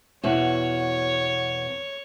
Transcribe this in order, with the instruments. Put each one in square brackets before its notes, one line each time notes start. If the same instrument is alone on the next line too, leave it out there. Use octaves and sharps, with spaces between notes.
[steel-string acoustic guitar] E2 B2 F#4 [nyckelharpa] C#5